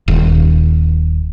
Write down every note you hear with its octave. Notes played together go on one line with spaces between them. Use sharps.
D#1